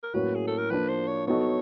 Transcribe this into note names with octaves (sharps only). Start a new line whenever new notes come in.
A#4
A2 F#3 A#3 C#4 F#4 B4
G#4
A4
A#4
F3 A#3 D4 B4
C5
C#5
F#3 B3 D#4 F#4 A4 C#5